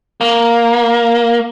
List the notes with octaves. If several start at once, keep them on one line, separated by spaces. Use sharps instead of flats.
A#3